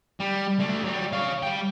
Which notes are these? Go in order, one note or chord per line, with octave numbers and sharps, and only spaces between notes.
G3
A3 D4
F#3 G3
C#5 F5
G3 G5